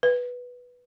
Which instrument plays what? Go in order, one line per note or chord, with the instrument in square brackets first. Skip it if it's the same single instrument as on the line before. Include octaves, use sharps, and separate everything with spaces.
[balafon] B4